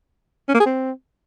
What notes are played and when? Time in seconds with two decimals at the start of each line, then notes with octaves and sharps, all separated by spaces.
0.48 C#4
0.54 A#3
0.60 G#4
0.66 C4